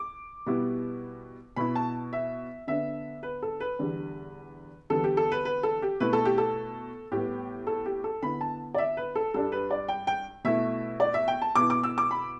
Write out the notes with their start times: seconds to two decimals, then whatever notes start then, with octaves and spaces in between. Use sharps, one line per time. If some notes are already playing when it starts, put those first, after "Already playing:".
Already playing: D6
0.46 B2 G3 B3 E4
1.56 B2 B3 E4 B5
1.76 A5
2.13 E5
2.67 D3 B3 D4 E5
3.23 B4
3.42 A4
3.60 B4
3.79 E2 D3 G3 D4
4.90 E2 D3 G3 B3 A4
5.04 G4
5.17 A4
5.32 B4
5.45 B4
5.63 A4
5.82 G4
6.00 B2 A3 E4 B4
6.13 A4
6.25 G4
6.38 A4
7.12 A2 G3 B3 G4
7.67 A4
7.86 G4
8.04 A4
8.22 D3 B3 E4 B5
8.41 A5
8.74 D5
8.78 E5
8.97 B4
9.15 A4
9.34 G2 G3 D4 A4
9.52 B4
9.71 D5
9.89 G5
10.07 G5
10.44 B2 A3 E4 E5
11.00 D5
11.14 E5
11.28 G5
11.42 A5
11.55 B2 B3 E4 D6
11.70 D6
11.83 E6
11.98 D6
12.11 B5